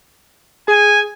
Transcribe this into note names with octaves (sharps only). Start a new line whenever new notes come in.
G#4 G#5